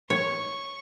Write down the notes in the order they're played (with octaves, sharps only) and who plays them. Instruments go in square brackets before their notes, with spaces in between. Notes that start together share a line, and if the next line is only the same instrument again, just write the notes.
[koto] C#5 [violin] C#6